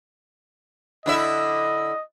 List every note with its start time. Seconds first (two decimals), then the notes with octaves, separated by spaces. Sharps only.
1.06 D3 E4 D#5 E5